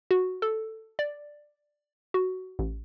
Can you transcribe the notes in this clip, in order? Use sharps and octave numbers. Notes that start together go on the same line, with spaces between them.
F#4
A4
D5
F#4
A1